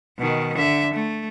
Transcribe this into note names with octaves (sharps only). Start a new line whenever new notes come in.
B2 D#3
D3 E5
A3